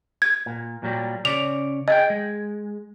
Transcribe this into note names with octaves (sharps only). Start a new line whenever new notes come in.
G#6
A#2
A#2 F#3 G3
C#3 C#4 D5 F7
G#4 D#5 E5 G5
G#3